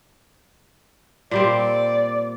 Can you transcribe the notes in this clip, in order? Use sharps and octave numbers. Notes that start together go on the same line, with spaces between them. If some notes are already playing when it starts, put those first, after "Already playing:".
A#2 G3 C4 D5